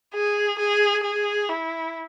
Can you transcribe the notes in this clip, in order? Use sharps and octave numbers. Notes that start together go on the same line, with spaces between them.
G#4
G#4
G#4
E4